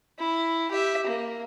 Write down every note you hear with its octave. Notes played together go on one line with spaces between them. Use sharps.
E4
G4 E5
A#3